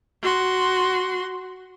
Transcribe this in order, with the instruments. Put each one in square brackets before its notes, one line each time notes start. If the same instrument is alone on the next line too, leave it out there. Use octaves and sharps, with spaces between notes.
[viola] F#4 C6